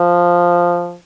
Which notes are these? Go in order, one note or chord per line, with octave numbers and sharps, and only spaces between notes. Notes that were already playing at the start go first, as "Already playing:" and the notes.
Already playing: F3